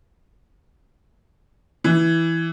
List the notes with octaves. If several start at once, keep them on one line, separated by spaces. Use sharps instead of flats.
E3